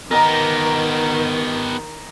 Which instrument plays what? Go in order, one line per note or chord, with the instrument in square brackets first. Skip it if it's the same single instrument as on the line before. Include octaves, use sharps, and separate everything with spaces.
[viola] D#3 [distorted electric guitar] B3 G4 [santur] A#4 D#5 A#5